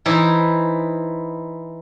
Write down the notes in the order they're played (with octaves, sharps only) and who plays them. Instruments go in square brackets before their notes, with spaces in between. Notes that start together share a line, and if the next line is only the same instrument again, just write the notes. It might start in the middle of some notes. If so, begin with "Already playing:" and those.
[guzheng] E3 D#4 E4 C5